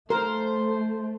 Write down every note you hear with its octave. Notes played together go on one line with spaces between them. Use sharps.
A3 A#4 C5